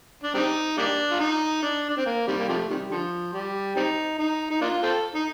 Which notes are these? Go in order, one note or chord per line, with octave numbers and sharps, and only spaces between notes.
D4
G3 C4 D#4
G3 A#3 D4
F4
D#4
D4
D4
C4
A#3
C3 D#3 G3
A#3
C3 F3 A3
C3 D#3 G3
D3 F3
G3
G3 C4 D#4
D#4
D#4
A#3 D4 F4
C4 F4 A4
D#4